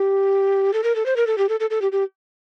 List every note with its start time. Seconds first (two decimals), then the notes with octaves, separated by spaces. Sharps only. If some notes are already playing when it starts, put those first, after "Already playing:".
Already playing: G4
0.73 A4
0.84 A#4
0.96 A4
1.06 C5
1.16 A#4
1.27 A4
1.38 G4
1.49 A4
1.60 A4
1.70 A4
1.82 G4
1.92 G4